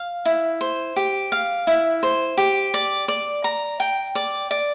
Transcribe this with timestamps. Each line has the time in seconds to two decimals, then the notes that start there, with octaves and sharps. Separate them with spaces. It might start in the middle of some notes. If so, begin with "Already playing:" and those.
Already playing: F5
0.25 E4
0.61 C5
0.96 G4
1.32 F5
1.67 E4
2.03 C5
2.37 G4
2.74 D5
3.08 D5
3.44 A#5
3.80 G5
4.15 D5
4.51 D5